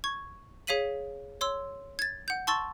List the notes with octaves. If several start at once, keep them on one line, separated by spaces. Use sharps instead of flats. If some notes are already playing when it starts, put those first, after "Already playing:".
C#6 G#6
G#4 C#5 F5 B6 D#7 F#7
C#5 C6 E6
G#6 A6
F#5 G6
A5 C6 C#6 E6 A6